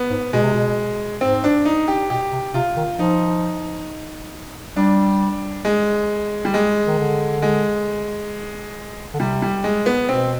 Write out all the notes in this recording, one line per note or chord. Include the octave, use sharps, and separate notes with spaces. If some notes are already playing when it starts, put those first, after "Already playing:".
Already playing: B3
G#2
B2 G#3
C3
B2
G#2 C4
D4
D#4
G4
B2 G4
C3
C3 F4
D#3
F3 D#4
G3 D4
G#3
G3
G#3
D#3
D3
G#3
D3
C3 G3
G3
G#3
B3
B2 C4